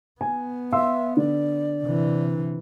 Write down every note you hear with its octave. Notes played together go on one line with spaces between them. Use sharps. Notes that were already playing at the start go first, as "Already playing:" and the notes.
B3 G#5
E5 F5 C6 E6
D3 D5
C3 E3